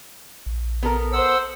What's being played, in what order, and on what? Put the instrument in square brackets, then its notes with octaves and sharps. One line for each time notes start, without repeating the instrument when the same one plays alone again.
[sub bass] A#1
[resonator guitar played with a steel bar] B3 A4 A#4
[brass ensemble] C5 [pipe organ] F#5 E6